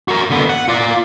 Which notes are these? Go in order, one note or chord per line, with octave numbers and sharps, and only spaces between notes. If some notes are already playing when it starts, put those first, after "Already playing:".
F#4 A#4
D3 B3
F#5
F4 D5